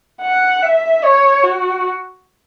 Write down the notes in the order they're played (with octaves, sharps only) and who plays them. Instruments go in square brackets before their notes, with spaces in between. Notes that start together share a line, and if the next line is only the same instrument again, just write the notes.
[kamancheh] F#5
E5
C#5
F#4